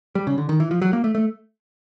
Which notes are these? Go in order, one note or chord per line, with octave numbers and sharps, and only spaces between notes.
G3
C#3
D3
D#3
E3
F3
F#3
A#3
A3
A3